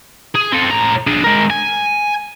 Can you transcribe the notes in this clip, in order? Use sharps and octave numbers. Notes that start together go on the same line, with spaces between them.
G#4
C4 A4
A2 A#5
D4 G#4
G#3 A#4
G#5